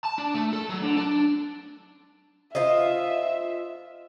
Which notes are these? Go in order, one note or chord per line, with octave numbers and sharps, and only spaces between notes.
A5
D4
A3
A4
F#3
D3
D4
F4 C5 D#5 E5